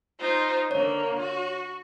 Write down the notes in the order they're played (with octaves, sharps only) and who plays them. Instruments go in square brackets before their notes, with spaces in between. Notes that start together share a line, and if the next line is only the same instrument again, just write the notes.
[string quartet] D#4 F4 C5
[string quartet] D3 A#3 [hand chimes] C#5
[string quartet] F#4